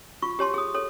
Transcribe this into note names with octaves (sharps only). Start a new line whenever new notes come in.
F4 C#6
G4 C#5 A5 C6
G#4 D#6
A4 C#5